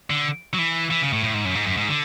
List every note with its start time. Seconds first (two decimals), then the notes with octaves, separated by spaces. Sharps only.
0.10 D3
0.54 F#3
0.58 E3
0.90 E3
1.02 C#3
1.13 A2
1.24 A2
1.34 G#2
1.45 F#2
1.55 G#2
1.67 F#2
1.77 G#2
1.89 D3